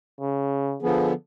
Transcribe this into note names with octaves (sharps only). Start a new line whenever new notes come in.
C#3
D3 F3 B3 G#4